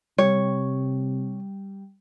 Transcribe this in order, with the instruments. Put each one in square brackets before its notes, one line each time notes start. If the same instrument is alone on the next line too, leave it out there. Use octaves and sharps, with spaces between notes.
[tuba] C3 [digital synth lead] G3 [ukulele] C#5